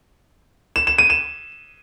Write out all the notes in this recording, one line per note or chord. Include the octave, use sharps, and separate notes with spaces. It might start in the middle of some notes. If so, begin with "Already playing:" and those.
E7
E7
D#7
E7